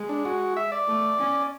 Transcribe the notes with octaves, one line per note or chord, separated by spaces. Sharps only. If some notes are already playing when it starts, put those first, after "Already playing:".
Already playing: G#3
D4
F#4
E5
D5
A3
C#4